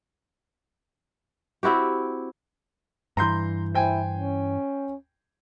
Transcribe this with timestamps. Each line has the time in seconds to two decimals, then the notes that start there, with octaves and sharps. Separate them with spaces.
1.63 C4 E4 F#4 G4
3.17 G2 E3 A#5 C6 G6
3.75 E4 C5 G5 G#5
4.17 C#4